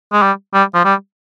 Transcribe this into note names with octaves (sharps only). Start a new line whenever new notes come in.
G#3
G3
G3
F3
G3